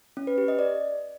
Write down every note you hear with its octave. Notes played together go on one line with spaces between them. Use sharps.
C#4
B4
G4
D#5
D5